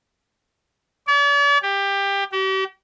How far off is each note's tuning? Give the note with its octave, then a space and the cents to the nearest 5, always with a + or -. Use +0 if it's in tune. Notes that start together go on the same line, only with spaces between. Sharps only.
D5 -45
G4 +20
G4 -40